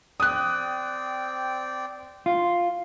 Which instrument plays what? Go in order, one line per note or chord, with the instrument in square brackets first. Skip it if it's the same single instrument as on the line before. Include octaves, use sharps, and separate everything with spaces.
[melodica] C4 D5 G5 [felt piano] D#6 F#6
[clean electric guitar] F4